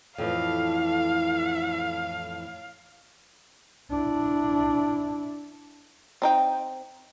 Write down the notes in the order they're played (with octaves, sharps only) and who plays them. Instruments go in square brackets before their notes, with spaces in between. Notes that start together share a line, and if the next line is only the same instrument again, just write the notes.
[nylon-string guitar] F2 A2 E3 [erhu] F5
[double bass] D4 E4
[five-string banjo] C4 D#4 G5